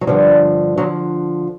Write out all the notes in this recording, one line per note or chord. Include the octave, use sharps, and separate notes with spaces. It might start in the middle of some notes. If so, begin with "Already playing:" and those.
F#3
G2 D3 F3 G3
D3 F3 F#3